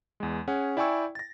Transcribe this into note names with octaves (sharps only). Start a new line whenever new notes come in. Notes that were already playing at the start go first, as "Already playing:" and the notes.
E2 G#3
C#4 G#4 F#5
E4 D5 G5 G#5 C#6 E6
A6 A#6